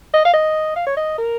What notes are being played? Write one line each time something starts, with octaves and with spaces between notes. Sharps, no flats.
D#5
F5
D#5
F5
C#5
D#5
A#4